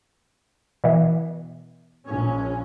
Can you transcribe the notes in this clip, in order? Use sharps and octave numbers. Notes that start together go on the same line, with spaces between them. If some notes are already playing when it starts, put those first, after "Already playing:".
B2 E3
A#1 C#4